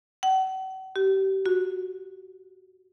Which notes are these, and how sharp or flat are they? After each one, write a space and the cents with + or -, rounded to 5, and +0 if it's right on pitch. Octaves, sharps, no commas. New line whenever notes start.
F#5 +45
G4 -30
F#4 -10